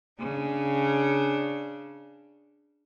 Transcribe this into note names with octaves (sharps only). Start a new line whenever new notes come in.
C#3 D4